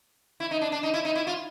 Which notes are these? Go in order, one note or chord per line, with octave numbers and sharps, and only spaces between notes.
E4
D#4
D4
D4
D#4
E4
D#4
E4
F4